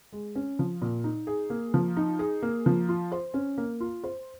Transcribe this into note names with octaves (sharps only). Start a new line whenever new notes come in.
G#3
C#4
F3
A#2
D#4
G#4
A#3
F3
D#4
G#4
A#3
F3
F4
C5
C#4
A#3
F4
C5